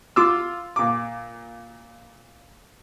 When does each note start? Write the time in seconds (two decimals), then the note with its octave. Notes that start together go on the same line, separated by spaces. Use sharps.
0.16 F4 D6 E6
0.76 A#2 D6